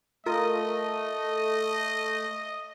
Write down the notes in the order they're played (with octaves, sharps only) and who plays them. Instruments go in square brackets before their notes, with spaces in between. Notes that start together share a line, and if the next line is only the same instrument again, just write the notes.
[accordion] A3 [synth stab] F4 A#4 D#6 [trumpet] D#5